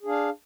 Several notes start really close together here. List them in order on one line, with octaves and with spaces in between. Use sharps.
G#4 D4 F5